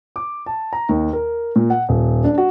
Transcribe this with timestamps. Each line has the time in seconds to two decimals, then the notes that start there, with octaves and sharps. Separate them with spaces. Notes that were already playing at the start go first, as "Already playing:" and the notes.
0.16 D6
0.46 A5
0.73 A#5
0.89 D#2
1.13 A#4
1.56 A#2
1.70 F#5
1.89 D#1
2.24 D4
2.38 F#4